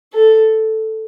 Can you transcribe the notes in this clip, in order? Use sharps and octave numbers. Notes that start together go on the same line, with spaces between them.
A4